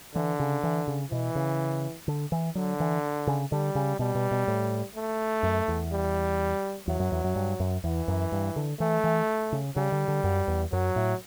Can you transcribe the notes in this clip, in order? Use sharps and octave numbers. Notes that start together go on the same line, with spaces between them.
D3 E3
C#3
E3
C#3
B2 E3
C#3
D3
E3
D3 F#3
E3
C#3
D3 G3
C#3
B2 G3
B2
B2
A2
A3
F#2
E2
G3
E2 F#3
F#2
E2
F#2
G2
F#2
E2 E3
F#2
G2
D3
E3 A3
E3
C#3
C#3 G3
D3
D3
F#2
E2
F#2 F#3
A2